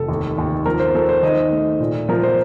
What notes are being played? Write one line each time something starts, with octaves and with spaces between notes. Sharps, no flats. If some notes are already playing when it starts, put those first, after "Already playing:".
Already playing: F1 A4
D#2
D#2
F3 A#4
C5
F3 A4
C5
D#3 D#5
A3
A#2
F3 A#4
C5